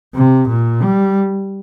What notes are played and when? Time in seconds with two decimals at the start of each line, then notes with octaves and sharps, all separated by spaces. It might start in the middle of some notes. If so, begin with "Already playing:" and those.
0.15 C3
0.49 A#2
0.82 G3